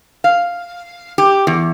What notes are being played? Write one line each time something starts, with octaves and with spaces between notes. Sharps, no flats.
F5
G4
E2